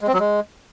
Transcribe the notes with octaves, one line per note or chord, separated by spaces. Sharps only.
G#3
C4
F#3
G#3